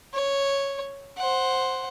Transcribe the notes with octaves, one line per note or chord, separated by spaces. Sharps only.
C#5
C5 F#5